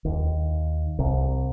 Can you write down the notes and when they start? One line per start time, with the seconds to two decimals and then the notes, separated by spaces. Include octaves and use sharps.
0.05 D#2
0.99 C2